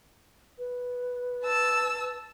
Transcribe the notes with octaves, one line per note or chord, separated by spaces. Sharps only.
B4
A5 E6